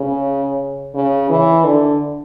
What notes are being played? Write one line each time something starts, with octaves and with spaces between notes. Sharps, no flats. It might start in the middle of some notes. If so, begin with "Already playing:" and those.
Already playing: C#3
C#3
E3
D3